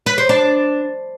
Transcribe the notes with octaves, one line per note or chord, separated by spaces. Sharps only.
B4
C5
D4